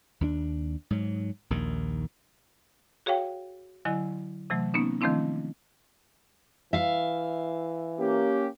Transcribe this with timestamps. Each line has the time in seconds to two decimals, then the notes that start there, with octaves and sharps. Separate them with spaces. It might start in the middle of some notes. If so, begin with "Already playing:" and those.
0.21 D#2 B3 D4
0.90 G#2 F#3
1.50 A#1 D#2 D#3
3.06 F#4 G#4 C#5 F5 G5
3.85 D3 F#3 E4 D#5 G#5
4.50 C3 E3 F#3 A3
4.74 A#3 B3 C#4 D#4
5.01 D#3 F3 A3 C4 D4 E4
6.73 E3 E5 F5
8.00 A#3 C#4 G4